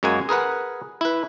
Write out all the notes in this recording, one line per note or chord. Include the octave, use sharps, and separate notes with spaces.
F#2 G#3 A#3 F#5 G#5
G#4 A#4 B4 F#5
E4 B4